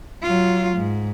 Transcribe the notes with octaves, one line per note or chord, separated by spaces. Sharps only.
F#3 F4
G#2